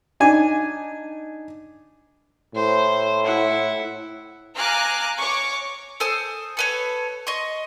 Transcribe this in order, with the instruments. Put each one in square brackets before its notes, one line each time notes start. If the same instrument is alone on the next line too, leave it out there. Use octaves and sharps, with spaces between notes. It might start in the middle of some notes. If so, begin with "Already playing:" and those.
[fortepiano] D4 D#4 G#5
[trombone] A2 [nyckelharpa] C5
[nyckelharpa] E4 F#5
[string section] F5 G#5 A#5 D6 F6 F#6
C#5 C#6 D6
[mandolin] A4 C5 G#5 D#6
A4 B4 C#5
D#5 C6 C#6